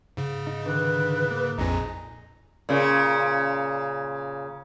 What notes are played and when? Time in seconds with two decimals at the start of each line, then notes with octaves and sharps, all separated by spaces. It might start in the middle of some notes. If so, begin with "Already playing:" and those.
0.17 G#2 C#3
0.47 D#4
0.66 D3 D#3 B4
1.31 A#3
1.58 A#1 F2 A#2 D#4 G#4 A#5
2.69 A#2 C#3